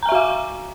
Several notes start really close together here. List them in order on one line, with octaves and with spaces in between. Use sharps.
A#5 G#5 E5 F#4 F5